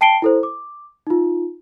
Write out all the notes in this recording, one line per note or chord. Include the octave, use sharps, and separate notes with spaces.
G5 A5 C7 D7 G7
E4 A4 C5
D6
D#4 F4